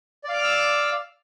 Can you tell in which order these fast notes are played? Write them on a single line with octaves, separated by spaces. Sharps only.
D5 F5 D6 F6 E6